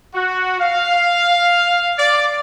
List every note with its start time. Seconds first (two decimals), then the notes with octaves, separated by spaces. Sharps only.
0.15 F#4
0.61 F5
1.99 D5